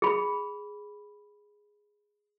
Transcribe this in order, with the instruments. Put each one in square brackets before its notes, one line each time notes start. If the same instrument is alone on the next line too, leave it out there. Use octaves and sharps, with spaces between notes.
[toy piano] G#4 B5